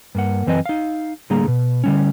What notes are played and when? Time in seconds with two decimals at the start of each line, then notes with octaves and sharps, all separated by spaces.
0.15 G2 A#3 F#5
0.47 F#2 E3 C4 B4 D#5 G#5
0.66 D#4 F5
1.30 A2 D3 G3 A#3 G#4 A#5
1.48 B2
1.84 D3 G3 C#4